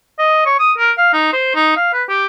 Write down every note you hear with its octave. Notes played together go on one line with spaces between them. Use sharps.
D#5
C#5
D#6
A#4
F5
D#4
C5
D#4
F5
B4
G4